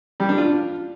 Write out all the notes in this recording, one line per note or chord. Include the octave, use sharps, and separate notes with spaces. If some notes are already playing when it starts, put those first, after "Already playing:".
G3
D4
F4